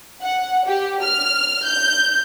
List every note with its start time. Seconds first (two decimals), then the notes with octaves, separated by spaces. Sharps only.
0.22 F#5
0.66 G4
1.03 F6
1.65 G6